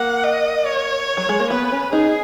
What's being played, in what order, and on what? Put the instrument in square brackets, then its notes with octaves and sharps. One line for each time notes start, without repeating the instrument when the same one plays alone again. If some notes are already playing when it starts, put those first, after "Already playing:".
Already playing: [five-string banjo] A#3 [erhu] F#5
[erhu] D#5
C#5
[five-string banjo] F#3
G#3
A#3
[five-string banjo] B3 [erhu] B4
[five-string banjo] C#4
[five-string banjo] D#4 [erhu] G#4